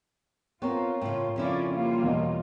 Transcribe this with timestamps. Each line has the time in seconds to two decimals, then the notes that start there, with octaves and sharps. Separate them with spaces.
0.62 B3 C4 F4 A#4 C5 C#5 G5
1.01 A2 C#3 G5
1.36 F2 C#3 C4 C#4 E4 F4 D5
1.72 G3 A#3 F4
2.03 E2 B2 D#5